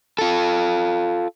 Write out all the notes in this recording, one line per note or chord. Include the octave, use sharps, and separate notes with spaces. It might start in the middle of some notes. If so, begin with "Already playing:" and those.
F4 A4